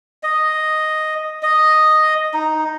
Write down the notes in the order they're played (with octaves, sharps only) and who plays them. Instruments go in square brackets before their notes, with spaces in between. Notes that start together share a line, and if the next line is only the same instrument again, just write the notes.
[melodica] D#5
D#5
D#4